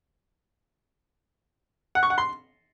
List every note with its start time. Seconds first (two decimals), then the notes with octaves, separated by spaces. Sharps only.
1.95 F#5
2.03 C#6
2.10 F#5
2.18 C6